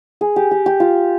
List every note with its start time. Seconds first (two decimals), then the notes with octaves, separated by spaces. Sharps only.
0.21 G#4
0.36 G4
0.51 G4
0.66 G4
0.80 F4